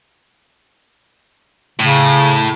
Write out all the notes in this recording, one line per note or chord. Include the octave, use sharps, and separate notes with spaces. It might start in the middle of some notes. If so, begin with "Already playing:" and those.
A2 C#3